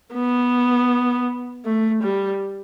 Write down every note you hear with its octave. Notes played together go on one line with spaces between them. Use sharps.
B3
A3
G3